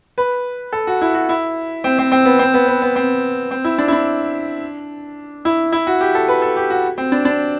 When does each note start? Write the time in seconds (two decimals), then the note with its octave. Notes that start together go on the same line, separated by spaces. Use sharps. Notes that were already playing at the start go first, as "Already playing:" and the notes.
0.18 B4
0.73 A4
0.87 F#4
1.01 E4
1.14 F#4
1.29 E4
1.84 C4
1.99 C4
2.12 C4
2.25 B3
2.39 C4
2.54 B3
2.68 B3
2.82 B3
2.96 C4
3.51 C4
3.64 E4
3.79 D4
3.88 E4
3.92 D4
5.45 E4
5.72 E4
5.87 F#4
6.01 G4
6.15 A4
6.28 B4
6.42 A4
6.57 G4
6.70 F#4
6.98 C4
7.12 D4
7.25 D4